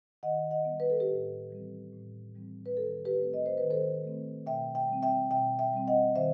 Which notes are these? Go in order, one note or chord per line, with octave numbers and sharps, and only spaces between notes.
D#3 D#5 F#5
D#5 F#5
G3 B3
B4
A4
G4 B4
A2
E3 G3 C4
A2
E3 G3 C4
B4
D#3 A4
G4 B4
A3 C4
D#5
C5
D#3 B4
A4 C5
A3 C4
B2 E5 G5
E5 G5
G3 C4
E5 G5
B2 E5 G5
E5 G5
G3 C4
D#5 F#5
D#3 C5 E5